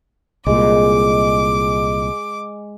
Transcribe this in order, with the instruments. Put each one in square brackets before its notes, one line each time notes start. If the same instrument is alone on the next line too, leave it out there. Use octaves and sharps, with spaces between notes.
[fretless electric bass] C2 A#2 [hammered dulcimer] G#3 [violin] D6